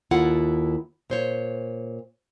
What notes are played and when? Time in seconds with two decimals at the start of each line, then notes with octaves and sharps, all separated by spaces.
0.11 D#2 E4 F4 A4 F#5
1.10 A#2 C5 C#5